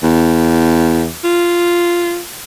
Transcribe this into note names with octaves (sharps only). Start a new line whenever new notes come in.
E2
F4